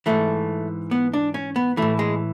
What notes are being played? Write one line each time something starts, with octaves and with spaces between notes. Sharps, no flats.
G#2 E3 A3
B3
D4
C#4
B3
A2 E3 A3
G#3